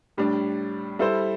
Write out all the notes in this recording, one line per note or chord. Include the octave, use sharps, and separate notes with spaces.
A2 G3 D4
G3 E4 A4 C5